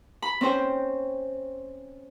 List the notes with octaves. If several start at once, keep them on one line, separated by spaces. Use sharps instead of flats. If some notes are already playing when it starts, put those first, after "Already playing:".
B5
C4 C#4 C5 G5